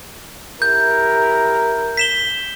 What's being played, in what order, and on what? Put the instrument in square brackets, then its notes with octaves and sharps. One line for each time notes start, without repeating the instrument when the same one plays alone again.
[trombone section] E4 G4 A#4 [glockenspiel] G6
[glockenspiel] B6 E7 G7